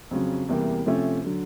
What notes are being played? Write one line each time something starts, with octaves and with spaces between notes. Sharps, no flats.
F2 C#3 F#3
E2 C3 E3 G3 A#3
C3 F3 A3 C#4
D3 F#3